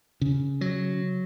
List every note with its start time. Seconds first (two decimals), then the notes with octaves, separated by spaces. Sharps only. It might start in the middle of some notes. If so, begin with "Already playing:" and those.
0.21 C#3
0.61 F#3